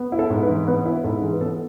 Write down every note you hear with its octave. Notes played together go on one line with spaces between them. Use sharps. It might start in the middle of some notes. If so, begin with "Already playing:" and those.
Already playing: B3
E4
A4
G#2
B4
E3
B3 B4
E4 B4
G#2 A4
E3 G#4
B4
B3 A4